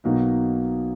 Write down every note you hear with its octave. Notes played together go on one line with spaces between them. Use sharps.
B1 B2 A#3 D#4